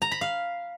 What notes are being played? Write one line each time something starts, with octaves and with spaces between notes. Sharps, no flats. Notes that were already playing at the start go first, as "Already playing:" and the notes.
A#5
B5
F5